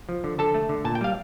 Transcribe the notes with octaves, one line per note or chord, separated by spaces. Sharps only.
F3
D3
D3 A4 A5
A3
D3
A#2 A5
G5
G3 F5